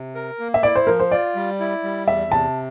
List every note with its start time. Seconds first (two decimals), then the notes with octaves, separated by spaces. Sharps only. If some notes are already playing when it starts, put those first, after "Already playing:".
Already playing: C3
0.15 A#4
0.39 A#3
0.54 E5
0.63 E4 D5
0.75 C5
0.87 F3 A#4
1.00 C5
1.11 F4 D5
1.35 G3
1.60 E4
1.84 G3
2.08 E2 E5
2.32 C3 A5